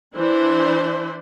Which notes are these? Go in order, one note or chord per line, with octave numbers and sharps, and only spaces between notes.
E3 D4 E4 C5